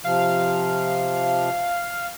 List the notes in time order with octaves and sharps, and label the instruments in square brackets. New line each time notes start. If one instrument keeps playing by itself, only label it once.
[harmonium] C3 F3 [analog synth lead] F5